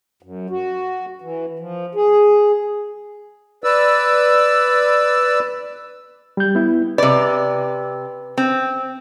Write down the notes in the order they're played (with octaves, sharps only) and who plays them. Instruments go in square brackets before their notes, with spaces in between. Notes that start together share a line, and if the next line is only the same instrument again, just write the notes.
[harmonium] F#2
F#4
E3
F3
G#4
[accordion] B4 D5 E6
[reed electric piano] G3 G6
B3 E4
[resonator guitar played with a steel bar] C3 D5 [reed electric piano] B4
[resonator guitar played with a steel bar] C4